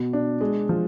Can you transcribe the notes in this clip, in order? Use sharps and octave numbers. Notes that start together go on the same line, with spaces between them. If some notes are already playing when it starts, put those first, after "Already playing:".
Already playing: B2
D4
G#3
F3